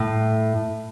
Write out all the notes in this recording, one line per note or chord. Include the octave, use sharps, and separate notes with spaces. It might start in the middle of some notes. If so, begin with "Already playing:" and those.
Already playing: A2